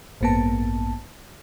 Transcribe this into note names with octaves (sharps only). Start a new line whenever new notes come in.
A1 G2 A#3 B3 A5